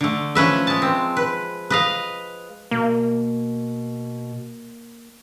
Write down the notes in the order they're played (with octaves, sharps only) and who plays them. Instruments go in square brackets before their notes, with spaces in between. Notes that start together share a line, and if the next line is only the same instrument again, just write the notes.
[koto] D3 A3
F3 C#4 B4 E5
G#3 A5
C4
B4
B4 D#5 F5
[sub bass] B2 [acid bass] A#3